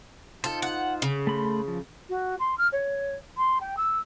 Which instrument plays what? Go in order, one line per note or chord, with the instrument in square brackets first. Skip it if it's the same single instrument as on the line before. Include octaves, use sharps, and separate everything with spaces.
[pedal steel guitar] D#4 F4 C5 [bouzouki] A4
[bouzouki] F#5
C#3
[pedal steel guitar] A3 B5 C6
F3
[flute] F#4
C6
F6
C#5
C6
G5
E6